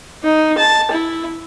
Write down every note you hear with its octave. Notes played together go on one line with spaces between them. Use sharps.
D#4
A5
E4